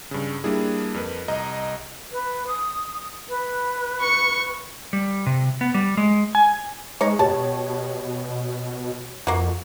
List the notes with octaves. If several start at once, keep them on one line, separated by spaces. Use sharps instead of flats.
G2 C#3
G3 A#3 D4 E4 G#4
F2 A#4 B4
C2 D#5 A#5
B4
D#6
B4
C#6 C#7
G3
C3
B3
G3
G#3
G#5
G#3 D#4 C#5
B2 G4 C#5 A5
F2 A#3 F#4